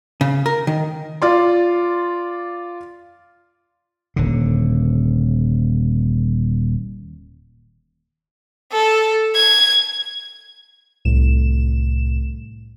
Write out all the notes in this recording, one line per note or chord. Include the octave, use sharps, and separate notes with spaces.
C#3
A#4
D#3
F4 D5 C6
D#1 D3
A4
G#6
C2 A2 E7